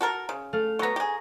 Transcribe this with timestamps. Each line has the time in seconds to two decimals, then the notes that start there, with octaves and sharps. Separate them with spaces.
0.01 F#4 A4 A#4
0.29 C#3
0.53 A3 F5
0.79 F#3 B3 A#5 C#6
0.96 G4 G#4